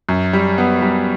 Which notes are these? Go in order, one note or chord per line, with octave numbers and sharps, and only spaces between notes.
F#2
G3
B3
G3